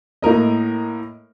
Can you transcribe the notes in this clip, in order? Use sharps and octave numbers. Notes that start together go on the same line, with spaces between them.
A2 A#3 A#4 D#5